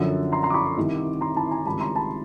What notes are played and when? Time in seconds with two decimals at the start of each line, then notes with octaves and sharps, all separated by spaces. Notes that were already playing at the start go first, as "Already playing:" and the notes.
Already playing: F#2 D3 F3
0.32 A#5 C6
0.43 A#5 C6
0.50 D6
0.54 B5 C#6
0.77 C2 C3 D#3
1.21 A#5 C6
1.36 A5 B5
1.51 G#5 A#5
1.65 C#2 C3 D#3 G3 A5 B5
1.81 A#5 C6
1.95 A5 B5